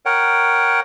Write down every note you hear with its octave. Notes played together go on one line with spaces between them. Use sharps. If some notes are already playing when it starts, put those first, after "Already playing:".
A#4 C#5 F#5 G5